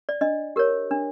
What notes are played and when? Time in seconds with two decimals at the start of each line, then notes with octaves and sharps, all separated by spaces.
0.09 D5
0.21 D4 D#5
0.56 G4 A#4 C#5
0.91 D4